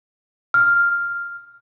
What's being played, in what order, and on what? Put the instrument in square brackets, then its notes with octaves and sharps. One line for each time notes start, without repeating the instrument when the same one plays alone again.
[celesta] F6